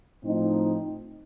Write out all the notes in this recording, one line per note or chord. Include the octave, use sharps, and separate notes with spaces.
A2 F3 C4 D#4